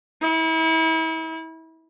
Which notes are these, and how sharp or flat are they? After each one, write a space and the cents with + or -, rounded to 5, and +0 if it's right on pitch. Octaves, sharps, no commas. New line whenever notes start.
E4 -35